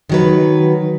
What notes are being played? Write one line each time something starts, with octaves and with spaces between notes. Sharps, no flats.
D#3 F#3 B4